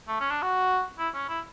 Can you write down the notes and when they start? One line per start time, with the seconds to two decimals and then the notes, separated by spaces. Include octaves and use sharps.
0.08 A3
0.20 C#4
0.31 D4
0.42 F#4
0.99 E4
1.14 C#4
1.29 E4